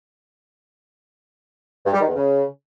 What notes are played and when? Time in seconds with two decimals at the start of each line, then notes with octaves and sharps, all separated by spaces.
1.86 G2
1.94 G3
2.01 D#3
2.08 E2
2.16 C#3